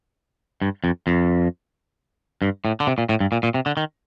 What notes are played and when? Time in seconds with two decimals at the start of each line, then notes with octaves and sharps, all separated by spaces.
0.62 G2
0.84 F2
1.07 F2
2.42 G2
2.65 A2
2.80 D3
2.87 C3
2.98 A#2
3.09 A2
3.20 G2
3.32 A#2
3.43 A#2
3.54 C3
3.66 D3
3.77 D#3